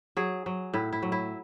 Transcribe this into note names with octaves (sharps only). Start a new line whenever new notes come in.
F#3 G#4
F#3
A2 E4
E4
F#3
E4